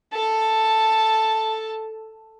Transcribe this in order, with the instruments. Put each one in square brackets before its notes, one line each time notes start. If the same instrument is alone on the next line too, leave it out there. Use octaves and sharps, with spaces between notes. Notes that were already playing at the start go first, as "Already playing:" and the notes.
[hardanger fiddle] A4 A5